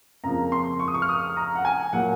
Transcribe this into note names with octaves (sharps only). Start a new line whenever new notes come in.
F2 C#3 F3 A#3 A#5
C6
C#6
D#6
C#6
F6
D#6
A#5
F#5
G#5
A#2 F#3 A#3 F#5